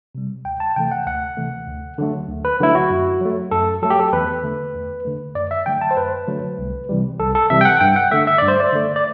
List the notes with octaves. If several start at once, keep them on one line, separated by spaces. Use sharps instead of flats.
C3 G3
D2 G5
A5
C3 E3 A3 G5
F#5
D2 F#5
C3 E3 A3
D2
D3 F#3 A3
D2
B4
D3 F#3 A3 E4
F#4
F#2
F#3 A3
F#2 A4
F#3 A3 A4
G4
A4
E2 B4
D3 A3
E2
D3 A3
F#2 D5
E5
D3 F#3 A3 G5
A5
C5
F#2 B4
D3 F#3 A3
C2
C3 E3 G3
C2 A4
A4
C3 E3 G3 E5
G5
F#5
G2 G5
F#5
D3 A3 E5
E5
G2 D5
C5
D5
D3 A3
D5